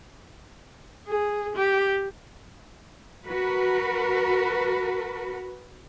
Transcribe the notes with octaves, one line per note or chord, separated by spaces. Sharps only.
G#4
G4
F#4 A#4 B4